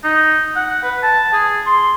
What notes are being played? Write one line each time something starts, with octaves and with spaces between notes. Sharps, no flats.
D#4
F#5
B4
A5
G#4
C6